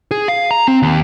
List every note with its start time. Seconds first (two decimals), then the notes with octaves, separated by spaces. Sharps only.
0.11 G#4
0.28 F5
0.51 A#5
0.68 C4
0.83 D#2